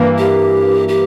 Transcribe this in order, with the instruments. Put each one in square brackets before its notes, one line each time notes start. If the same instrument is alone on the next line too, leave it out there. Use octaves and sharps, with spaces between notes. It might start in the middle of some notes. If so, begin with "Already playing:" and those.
Already playing: [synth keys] G2 E3 A#3
[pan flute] G4
G4